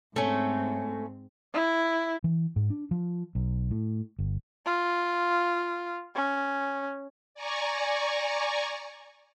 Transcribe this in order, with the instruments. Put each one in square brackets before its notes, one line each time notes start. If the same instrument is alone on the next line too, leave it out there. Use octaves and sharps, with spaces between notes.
[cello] G#2 C4 [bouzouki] A3 C#4
[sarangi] E4
[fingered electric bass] E3
G#2
D4
F3
B1
A2
G1
[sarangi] F4
C#4
[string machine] D5 G#5 A#5 C#6